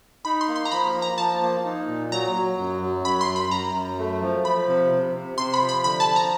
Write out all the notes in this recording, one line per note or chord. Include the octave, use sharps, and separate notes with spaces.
D#4 B5
C6
A#3
C6
A#5
F3 B5
A#3
A#5
F3 A5
A#3
D#4
A#2
F#3 A#5
F#3
F#2
F#3
F#2 B5
C6
F#2
B5
F#2 A#5
F#2
A3
F3
F3 B5
C3
C3
C3
C3 C6
B5
F3
B5
D3 B5
A5
F3
A#5